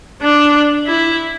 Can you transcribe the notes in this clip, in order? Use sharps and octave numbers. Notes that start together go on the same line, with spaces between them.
D4
E4